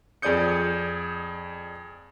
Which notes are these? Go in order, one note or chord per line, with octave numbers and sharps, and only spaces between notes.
F2 G#4 D5 D#6 G6 C#7